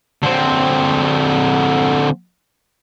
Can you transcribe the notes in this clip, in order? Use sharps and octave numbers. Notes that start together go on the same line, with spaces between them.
D3 C4